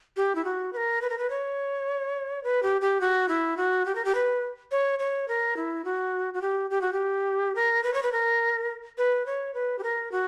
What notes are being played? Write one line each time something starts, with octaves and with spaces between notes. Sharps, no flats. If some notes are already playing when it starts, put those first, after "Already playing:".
G4
E4
F#4
B4
A#4
B4
A#4
B4
C#5
B4
G4
G4
F#4
E4
F#4
G4
A#4
G4
B4
C#5
C#5
A#4
E4
F#4
F#4
G4
G4
F#4
G4
A#4
B4
C#5
B4
A#4
B4
C#5
B4
G4
A#4
F#4